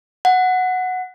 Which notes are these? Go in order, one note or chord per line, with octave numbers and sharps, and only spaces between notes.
F#5